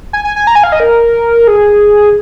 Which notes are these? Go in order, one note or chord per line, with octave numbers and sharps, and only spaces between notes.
G#5
G#5
G#5
A#5
G#5
F5
D#5
A#4
G#4